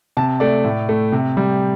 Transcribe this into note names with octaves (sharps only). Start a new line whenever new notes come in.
C3 A5
A3 D5
A2
A3
C3
G3